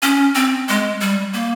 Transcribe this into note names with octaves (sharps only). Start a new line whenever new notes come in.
C#4
C4
G#3
G3
A#3